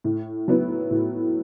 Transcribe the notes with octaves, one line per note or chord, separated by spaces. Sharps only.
A2
F#3 B3 E4
A2